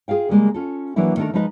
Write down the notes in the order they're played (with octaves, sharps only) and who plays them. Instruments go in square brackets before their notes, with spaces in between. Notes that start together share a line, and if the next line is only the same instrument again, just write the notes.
[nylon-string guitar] F4 G#4 D5 F5 G5
C#3 G3 G#3 A#3
C#4 F4 A4
E3 F#3 A#3 D4 E4
D#3 A3 B3 D4 A4 A#4
F3 G#3 D#4 B4 D#5